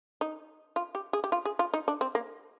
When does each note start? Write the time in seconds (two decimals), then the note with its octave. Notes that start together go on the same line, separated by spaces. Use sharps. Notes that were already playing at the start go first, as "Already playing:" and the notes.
0.21 D#4
0.76 F4
0.95 G4
1.13 G#4
1.24 G4
1.32 F4
1.45 G#4
1.59 F4
1.74 D#4
1.88 D4
2.01 C4
2.15 A#3